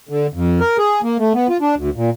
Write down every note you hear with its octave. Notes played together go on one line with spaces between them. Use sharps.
D3
F2
A#4
G#4
A#3
A3
B3
F4
D4
D2
A#2